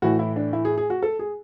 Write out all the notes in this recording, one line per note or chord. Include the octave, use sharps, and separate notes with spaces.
A2 E3 F#4
E4
D4
E4
G#4
G#4
F#4
A4
G#4